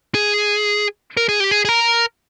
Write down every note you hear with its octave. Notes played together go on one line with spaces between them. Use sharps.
G#4
A#4
G#4
G4
G#4
G#4
A#4